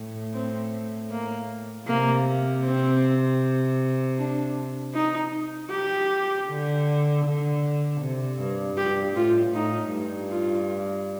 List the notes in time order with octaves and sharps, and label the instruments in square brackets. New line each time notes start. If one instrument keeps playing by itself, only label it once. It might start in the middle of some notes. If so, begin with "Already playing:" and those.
Already playing: [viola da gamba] A2
[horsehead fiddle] C4
A#3
[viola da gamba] C3 [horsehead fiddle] A#3
[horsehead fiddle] C4
D4
D#4
G4
[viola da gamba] D3
D3
C3
G2
[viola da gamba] G2 [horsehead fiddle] G4
[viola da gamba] A2 [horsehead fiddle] F4
[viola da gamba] A2 [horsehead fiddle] D#4
[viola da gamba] G2
[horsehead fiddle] F4